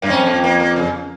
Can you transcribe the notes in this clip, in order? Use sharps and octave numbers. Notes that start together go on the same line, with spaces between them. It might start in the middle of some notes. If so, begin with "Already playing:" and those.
G2 A#3
F2 C#4
A#3
A#3
A#3
C#3